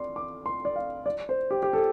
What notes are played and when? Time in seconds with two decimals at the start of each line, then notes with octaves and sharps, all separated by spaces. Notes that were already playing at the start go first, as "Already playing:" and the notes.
Already playing: D5 C6
0.16 D6
0.46 C6
0.65 D5
0.76 F5
1.06 D5
1.29 C5
1.51 G4
1.63 G4
1.73 A4